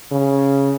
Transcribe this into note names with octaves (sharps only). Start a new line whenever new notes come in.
C#3